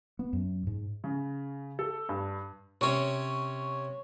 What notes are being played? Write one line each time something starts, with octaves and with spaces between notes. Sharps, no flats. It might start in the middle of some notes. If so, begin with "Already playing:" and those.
B3
F#2
G#2
C#3
A4
G2
C3 C#4 C#5